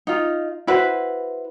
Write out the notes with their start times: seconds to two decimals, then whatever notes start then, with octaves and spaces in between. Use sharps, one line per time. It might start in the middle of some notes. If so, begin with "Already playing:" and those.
0.07 D#4 F4
0.67 E4 F#4 B4 C5